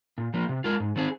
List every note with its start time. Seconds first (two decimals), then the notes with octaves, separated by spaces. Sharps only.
0.18 A#2
0.34 F3 A#3
0.49 C3
0.64 G#3 F4 A#4
0.80 G#2
0.96 D#3 C4 G#4